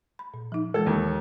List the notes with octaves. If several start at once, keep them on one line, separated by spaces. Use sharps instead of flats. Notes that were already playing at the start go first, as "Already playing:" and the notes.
B5
A#2
F3 D#4
E3 G#3 A4
D#2